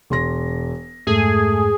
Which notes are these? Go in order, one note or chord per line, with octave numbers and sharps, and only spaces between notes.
E1 C6 A#6
F2 G#2 G#3 A3 G#4